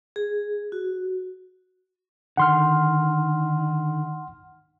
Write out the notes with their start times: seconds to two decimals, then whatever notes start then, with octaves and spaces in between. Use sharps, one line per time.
0.16 G#4
0.72 F#4
2.37 D3 D#3 F#5 C6 F6